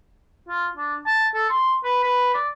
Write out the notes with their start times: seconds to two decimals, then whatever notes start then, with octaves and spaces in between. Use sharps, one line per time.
0.48 F4
0.77 D4
1.06 A5
1.34 A4
1.50 C6
1.84 B4
2.04 B4
2.34 D5